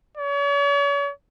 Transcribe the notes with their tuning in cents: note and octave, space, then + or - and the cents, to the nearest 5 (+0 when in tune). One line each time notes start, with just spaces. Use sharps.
C#5 +40